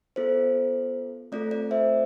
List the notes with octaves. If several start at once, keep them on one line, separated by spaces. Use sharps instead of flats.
B3 F4 A4 C5
A3 C4 F4 A4 D5
D5
C5 E5